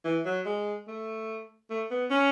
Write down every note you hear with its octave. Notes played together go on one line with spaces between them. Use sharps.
E3
F#3
G#3
A3
A3
B3
C#4